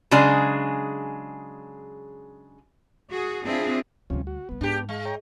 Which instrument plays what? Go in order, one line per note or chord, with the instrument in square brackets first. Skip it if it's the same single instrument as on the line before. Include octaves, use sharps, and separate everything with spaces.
[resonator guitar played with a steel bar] C#3 F#3 G#3 D4 G#4
[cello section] F#4 G#4
C4 D4 E4 F4 G#4
[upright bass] D2 G3 [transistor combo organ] C3 F3 C#4
[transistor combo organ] F#4
[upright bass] C2 G3 [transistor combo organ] B3
[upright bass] G#2 [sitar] D4 G4
[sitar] G#3 [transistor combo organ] F5
[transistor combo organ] C#5 G5 A#5